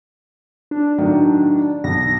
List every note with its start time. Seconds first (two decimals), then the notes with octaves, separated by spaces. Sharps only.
0.71 D4
0.98 A2 D#3 F#3
1.84 B1 A#6